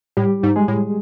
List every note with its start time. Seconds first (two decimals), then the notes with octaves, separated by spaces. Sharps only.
0.17 A2 G3 G4
0.43 G#2
0.56 G#3 G#4
0.68 A2